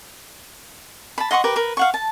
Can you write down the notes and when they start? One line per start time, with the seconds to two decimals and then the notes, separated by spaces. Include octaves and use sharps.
1.18 A5 B5
1.31 D#5 F#5 C6 C#6
1.44 G4 A#4 B4
1.56 A#4 B4
1.77 F5 F#5 C#6
1.94 A5